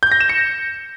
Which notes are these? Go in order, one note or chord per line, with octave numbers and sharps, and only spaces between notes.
G6
A#6
E7
C#7